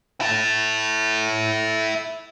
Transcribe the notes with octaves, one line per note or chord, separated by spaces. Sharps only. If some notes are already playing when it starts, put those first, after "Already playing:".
E4 A4